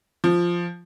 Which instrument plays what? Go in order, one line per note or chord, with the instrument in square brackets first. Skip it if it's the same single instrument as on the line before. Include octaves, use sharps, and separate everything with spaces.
[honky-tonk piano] F3